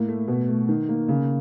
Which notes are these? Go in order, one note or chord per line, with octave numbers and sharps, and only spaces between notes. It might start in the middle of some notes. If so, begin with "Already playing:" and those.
Already playing: A2 A#3
A3
B2
A3
D#3
A#3
C#3